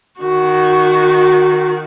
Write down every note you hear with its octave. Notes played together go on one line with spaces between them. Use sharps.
D#3 F#4